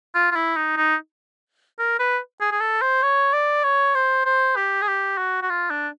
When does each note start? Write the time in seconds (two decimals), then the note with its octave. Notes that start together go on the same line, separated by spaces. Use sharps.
0.15 F4
0.32 F4
0.36 E4
0.56 D#4
0.77 D#4
1.79 A#4
1.99 B4
2.41 G#4
2.51 G#4
2.61 A4
2.81 C5
3.03 C#5
3.33 D5
3.64 C#5
3.95 C5
4.25 C5
4.56 G4
4.82 G#4
4.88 G4
5.18 F#4
5.42 F#4
5.50 F4
5.70 D4